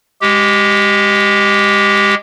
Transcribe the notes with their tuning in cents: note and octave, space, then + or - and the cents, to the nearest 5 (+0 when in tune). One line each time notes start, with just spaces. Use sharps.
G#3 -20 G4 -10